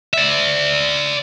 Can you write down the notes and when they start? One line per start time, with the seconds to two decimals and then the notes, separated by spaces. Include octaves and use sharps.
0.13 D5 E5